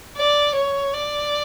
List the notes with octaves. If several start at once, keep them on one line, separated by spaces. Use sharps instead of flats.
D5
C#5
D5